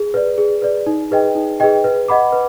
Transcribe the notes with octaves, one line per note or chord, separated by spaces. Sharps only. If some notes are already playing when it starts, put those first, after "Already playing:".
Already playing: G#4
B4 D5
G#4
B4 D5
D#4
G#4 B4 D#5 G5
D#4
G#4 B4 D#5 G5
B4
D#5 F#5 B5 D6
B4